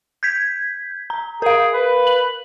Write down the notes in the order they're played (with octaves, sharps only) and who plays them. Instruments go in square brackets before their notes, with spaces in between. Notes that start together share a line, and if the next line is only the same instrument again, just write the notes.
[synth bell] G6 G#6 B6
A#5
[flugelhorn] G#4 [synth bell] A#4 F5
[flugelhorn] B4
[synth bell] F#7